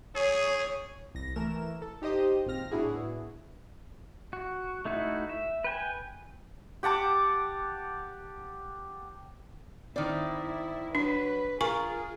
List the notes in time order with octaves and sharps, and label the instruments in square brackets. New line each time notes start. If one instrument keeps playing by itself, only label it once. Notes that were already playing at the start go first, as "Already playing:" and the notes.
[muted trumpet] G#4 [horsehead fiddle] C#5
[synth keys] C2 A#6
E3 A3 A#4 E7
A4
D#4 G4 C5 D#5 D#6
G#1 A#2 C4 F6 A#6
A2 B3 D4 E4 F#4 G#4
[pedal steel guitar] F#4
A3 D#4 E4 F#4
E5
B4 G5 G#5
[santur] G4 F#5 A5 D6
[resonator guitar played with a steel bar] D#3 C4 [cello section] E4 [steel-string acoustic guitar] D5
[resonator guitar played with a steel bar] F#3 [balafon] D4 [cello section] B4
[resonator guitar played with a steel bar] F4 [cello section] G#4 [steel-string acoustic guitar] A#4 [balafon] G#5 C#6